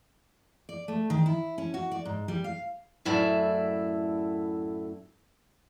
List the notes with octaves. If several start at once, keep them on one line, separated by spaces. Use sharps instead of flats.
D5
A3
D#3
E4
C#4
F#4
D5
G#2
G3
F5
F#2 A2 E4 D5 E5